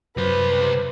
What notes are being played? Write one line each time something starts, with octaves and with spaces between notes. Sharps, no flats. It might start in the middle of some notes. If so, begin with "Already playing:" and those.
C2 F#2 B4 C5